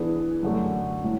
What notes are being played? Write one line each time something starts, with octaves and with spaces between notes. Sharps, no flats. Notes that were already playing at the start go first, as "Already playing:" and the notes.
Already playing: E3 B3 D4 G#4
F#2 D3 A3
A2